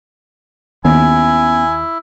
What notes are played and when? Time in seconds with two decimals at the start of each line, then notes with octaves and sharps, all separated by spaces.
0.85 D#2 B3 C#4 E4 G#5